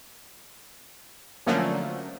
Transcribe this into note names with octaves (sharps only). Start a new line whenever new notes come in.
D3 F3 F#3 A3 A#3 C#4